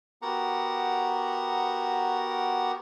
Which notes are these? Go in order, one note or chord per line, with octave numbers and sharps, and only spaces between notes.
B3 F#4 G4 A#4 F#5 A#5